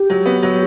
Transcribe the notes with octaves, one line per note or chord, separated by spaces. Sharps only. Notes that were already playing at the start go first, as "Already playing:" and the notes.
Already playing: G4
F#3
B3
F#3